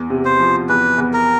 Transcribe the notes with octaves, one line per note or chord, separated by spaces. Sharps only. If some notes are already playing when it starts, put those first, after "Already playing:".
Already playing: E2
C3
C5
F3
E2 B4
E2
A#4